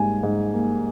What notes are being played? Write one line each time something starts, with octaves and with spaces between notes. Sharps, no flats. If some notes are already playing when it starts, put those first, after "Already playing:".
Already playing: G#2 G3 A#3 G#5
G#2
A#3